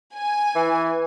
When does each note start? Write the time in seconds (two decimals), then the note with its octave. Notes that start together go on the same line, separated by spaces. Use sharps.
0.15 G#5
0.55 E3